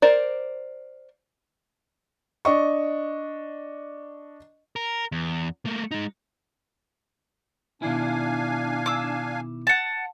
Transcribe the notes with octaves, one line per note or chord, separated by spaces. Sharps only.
A#4 C5 D5
D4 D#5 C#6
A#4
E2
A3 A#3
G#3 D#4
B2 D#3 D4 E4 F5 G#5
D6 E6
F#5 A5